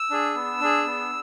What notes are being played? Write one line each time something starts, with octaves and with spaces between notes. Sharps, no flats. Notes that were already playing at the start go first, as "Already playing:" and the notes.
Already playing: E6
D4 G#4
B3
D4 G#4
B3